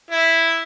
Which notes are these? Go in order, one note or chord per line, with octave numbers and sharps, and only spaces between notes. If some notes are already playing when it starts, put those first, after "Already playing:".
E4